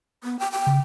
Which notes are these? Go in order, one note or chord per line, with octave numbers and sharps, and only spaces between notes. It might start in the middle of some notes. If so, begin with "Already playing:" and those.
B3
G5
G5
C#3